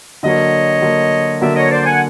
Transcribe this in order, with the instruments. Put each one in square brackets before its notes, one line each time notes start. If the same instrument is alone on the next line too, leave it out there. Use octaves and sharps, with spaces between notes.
[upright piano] D3 F#3 A#3 [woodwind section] C#5 D#5
[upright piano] D3 F#3 A#3
[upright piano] D3 F#3 A#3 [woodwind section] D5 E5
[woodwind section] C#5 D#5
C5 D5
F#5 G#5